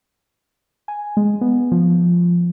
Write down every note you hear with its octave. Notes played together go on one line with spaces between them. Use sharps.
G#5
G#3
B3
F3